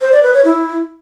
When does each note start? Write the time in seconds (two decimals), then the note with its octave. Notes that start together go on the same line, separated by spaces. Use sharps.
0.01 C5
0.12 D5
0.23 B4
0.34 C#5
0.45 E4